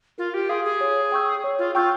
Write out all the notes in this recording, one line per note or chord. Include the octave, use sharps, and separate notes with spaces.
F4 A#4
G4
G#4 F5 C6
G#4
C#5
G5 C#6 E6 G6
C#5
F4
F4 G5 C#6 E6 G6